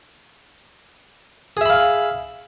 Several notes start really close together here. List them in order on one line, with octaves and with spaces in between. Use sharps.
G#4 E5 B5 F5